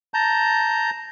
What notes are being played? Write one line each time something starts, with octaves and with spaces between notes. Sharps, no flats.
A5 A#5 G6